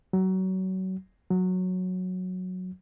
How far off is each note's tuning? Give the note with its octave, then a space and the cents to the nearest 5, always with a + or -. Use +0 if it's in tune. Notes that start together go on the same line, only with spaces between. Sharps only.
F#3 +25
F#3 -10